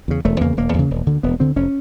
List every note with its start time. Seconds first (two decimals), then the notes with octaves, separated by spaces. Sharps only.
0.08 E2 C#3
0.25 E1 A3
0.41 E2 C#3 A#3
0.57 E1 A#3
0.74 E2 C#3
0.91 E1
1.07 D2 D3
1.23 E1 B3
1.40 D2 D3 C4
1.56 F1 C#4